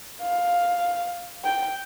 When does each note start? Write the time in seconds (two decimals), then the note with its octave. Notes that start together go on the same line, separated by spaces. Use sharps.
0.22 F5
1.44 G5